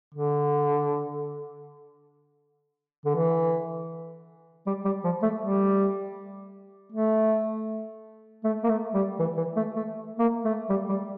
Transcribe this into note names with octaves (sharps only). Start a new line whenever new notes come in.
D3
D3
E3
G3
G3
F3
A3
G3
A3
A3
A#3
A3
G3
E3
E3
A3
A3
A#3
A3
G3
G3